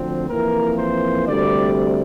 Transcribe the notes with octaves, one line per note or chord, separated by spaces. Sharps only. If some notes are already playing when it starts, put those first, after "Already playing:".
Already playing: D2 D3 F3 C4
F2 E3 A#3 A#4
C5
D2 C3 G3 D5